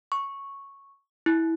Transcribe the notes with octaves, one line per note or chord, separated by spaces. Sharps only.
C#6
E4